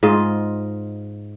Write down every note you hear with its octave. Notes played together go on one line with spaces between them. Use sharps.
G#2 F4 D#5